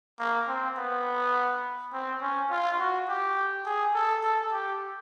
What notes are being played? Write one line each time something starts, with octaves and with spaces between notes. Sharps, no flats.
A#3
C4
B3
C4
C#4
F4
F#4
G4
G#4
A4
A4
G4